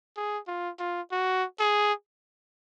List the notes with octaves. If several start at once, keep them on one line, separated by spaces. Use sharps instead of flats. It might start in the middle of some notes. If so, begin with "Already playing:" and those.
G#4
F4
F4
F#4
G#4